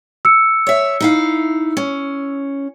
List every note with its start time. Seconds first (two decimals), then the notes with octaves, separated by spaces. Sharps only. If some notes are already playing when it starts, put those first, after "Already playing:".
0.25 E6 C#7
0.67 C#5 E5
1.00 D#4 E4 F5
1.77 C#4